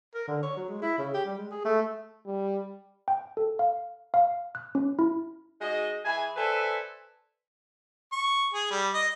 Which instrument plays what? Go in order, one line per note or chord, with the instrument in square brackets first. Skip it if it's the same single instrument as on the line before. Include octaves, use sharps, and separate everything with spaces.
[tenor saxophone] A#4
D3
C#5
F#3
G#3
E4
C#3
G4
G3
G#3
G#4
A3
[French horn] G3
[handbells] G5
A4
F5
F5
F#6
C#4
E4
[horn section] G#3 D#4 F#4 D#5
E3 G#4 E5 G#5
A4 B4 C5 D5 E5 G#5
[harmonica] C#6
G#4
G3
D#5